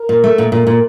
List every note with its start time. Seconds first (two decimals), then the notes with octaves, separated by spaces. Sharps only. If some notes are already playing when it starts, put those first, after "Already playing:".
Already playing: A#4
0.09 A#2
0.24 A3
0.38 A#2
0.52 A#2
0.67 A#2